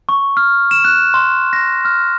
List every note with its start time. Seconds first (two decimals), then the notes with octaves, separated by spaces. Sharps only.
0.09 C#6
0.37 F6
0.71 E7
0.85 F#6
1.14 C6
1.53 A#6
1.85 F6